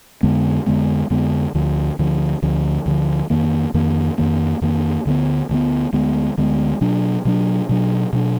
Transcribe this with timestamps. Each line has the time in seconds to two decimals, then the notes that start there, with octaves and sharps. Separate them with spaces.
0.23 F2 D3 G#3 B3
0.66 F2 D3 G#3 B3
1.10 F2 D3 G#3 B3
1.54 D2 D3 F3
1.99 D2 D3 F3
2.42 D2 D3 F3
2.86 D2 D3 F3
3.30 F2 D#3 A#3
3.74 F2 D#3 A#3
4.18 F2 D#3 A#3
4.61 F2 D#3 A#3
5.06 D2 D3 G#3 B3
5.49 D2 D3 G#3 B3
5.93 D2 D3 G#3 B3
6.38 D2 D3 G#3 B3
6.81 B2 F#3 D4
7.25 B2 F#3 D4
7.69 B2 F#3 D4
8.13 B2 F#3 D4